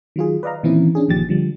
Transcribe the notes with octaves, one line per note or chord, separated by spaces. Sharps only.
D#3 F#3 F4 G#4
B4 D5 D#5 F5 A#5
A#2 D#3 E3 C4 C#4 E4
C#4 D4 G#4
G1 A#2 D#3 F3 G4 A6
D3 F3 G3